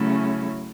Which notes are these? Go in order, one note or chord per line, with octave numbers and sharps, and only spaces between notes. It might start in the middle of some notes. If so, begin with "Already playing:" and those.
Already playing: C#3 F#3 A3 C#4 E4